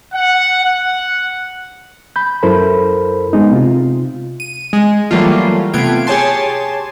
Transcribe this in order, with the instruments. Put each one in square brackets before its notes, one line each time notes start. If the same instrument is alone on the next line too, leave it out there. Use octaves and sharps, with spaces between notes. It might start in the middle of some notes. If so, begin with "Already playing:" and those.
[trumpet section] F#5
F#5
[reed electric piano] B5 G6
F#2 E4 A4 A#4 C5 B5
G#3 B3 D#4
C3 F4
[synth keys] D#7
G#3
E3 F#3 G3 A3 A#3 F4
C3 A3 B3 F4 G#6 D7
G4 G#4 C#5 G#5 A5 C6